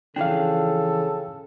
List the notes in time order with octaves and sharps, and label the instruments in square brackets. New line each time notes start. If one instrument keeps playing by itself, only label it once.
[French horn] C#3 [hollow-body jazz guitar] E3 F3 D4 [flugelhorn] A4 [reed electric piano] F5 G5